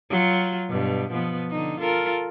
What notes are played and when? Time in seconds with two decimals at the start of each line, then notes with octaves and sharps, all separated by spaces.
0.10 F#3 F4
0.69 G2 B2
1.11 B2 F3 B3
1.50 D3 D#4
1.80 F4 A4 A#4